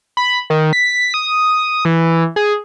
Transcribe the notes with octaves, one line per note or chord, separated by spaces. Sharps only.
B5
D#3
B6
D#6
E3
G#4